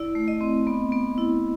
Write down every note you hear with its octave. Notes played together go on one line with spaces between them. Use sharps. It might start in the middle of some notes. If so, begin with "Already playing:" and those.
Already playing: E4 D5
A3
D#5
C4
B3
B3
E4